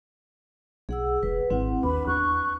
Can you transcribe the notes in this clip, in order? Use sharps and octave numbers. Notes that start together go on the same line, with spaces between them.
B1 G#4 F#5 E6
E1 B4
G#1 C4 E4 F#5
D#2 D4 B4 B5
E2 C#6 F#6